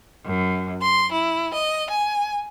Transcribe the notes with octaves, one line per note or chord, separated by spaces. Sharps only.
F#2
C6
E4
D#5
G#5